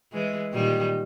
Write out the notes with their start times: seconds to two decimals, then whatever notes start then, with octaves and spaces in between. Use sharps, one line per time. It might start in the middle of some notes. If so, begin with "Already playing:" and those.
0.12 E3 G#3
0.52 A#2 D#3 G3